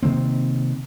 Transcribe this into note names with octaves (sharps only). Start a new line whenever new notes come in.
C3 D#3 A#3 C4